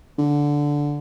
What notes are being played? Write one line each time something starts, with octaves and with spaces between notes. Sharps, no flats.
D3